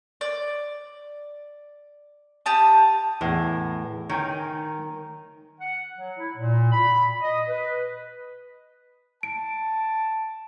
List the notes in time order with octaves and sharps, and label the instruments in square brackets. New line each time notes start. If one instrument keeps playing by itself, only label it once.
[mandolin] D5
G4 A5 D#6
[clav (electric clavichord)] E2 [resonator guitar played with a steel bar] A2
[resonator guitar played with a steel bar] D#3 [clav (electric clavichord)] C#5 G5 G#5
[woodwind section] F#5
F#3
E4
A#2
B5
D#5
B4
[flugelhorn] A5 [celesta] D7